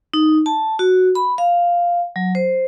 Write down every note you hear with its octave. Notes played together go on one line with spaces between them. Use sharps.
D#4
A5
F#4
B5
F5
F#3
C5